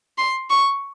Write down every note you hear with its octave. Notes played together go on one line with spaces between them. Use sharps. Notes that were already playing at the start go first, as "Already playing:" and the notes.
C6
C#6